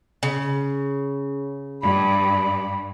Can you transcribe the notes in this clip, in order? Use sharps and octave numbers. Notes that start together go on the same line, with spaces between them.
C#3
G2 B5